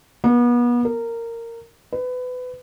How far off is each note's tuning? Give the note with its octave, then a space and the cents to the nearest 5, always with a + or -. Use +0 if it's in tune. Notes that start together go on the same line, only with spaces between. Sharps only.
B3 -35
A#4 -15
B4 +25